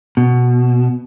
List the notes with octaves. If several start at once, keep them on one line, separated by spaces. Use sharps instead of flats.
B2